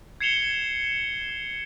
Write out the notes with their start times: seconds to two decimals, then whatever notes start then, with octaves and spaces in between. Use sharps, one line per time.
0.20 G#6 C7 C#7 E7 F7 G7